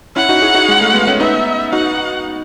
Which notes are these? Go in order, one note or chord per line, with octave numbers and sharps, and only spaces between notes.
C#4 E4 F#5
D#4 F#4
E4 G#4
D#4 F#4
G#3
A3
G#3 B3
A3 C#4
B3 D#4 E5
D#4 F#4 F#5